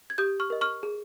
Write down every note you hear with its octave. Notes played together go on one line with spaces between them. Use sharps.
G#6
G4 D#6 G6
C#6 F6
A#4 D#5
C#6 F6
G#4